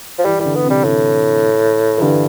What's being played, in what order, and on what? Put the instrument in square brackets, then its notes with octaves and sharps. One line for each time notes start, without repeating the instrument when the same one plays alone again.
[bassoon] F3
[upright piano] E3 [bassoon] G3
[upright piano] E3 [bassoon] G3
[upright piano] D3
[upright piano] D3 [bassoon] B3
[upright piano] C3
[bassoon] G3
[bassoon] A2 [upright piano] C3
[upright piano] E3
[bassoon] G2 [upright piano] D3